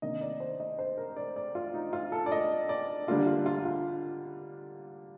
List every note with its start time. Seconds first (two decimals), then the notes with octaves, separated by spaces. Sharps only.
0.02 C3 D#3 A#3 D4 D#5
0.21 D5
0.40 C5
0.60 D#5
0.79 C5
0.98 A#4
1.17 D5
1.36 D5
1.55 F4
1.74 D#4
1.93 F4
2.12 A4
2.26 D5
2.32 D#5
2.69 D5
3.07 D3 G3 A#3 D4 F4
3.26 F4
3.46 F4
3.65 F4